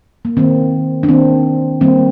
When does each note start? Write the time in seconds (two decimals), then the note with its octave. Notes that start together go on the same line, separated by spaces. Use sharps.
0.25 A#3
0.37 D#3 A#3 C4
1.03 D4
1.09 D#3 A#3 C4
1.81 D#3 G3 A#3 C4